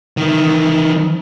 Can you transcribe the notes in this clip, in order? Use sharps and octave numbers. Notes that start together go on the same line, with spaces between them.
D#3 E3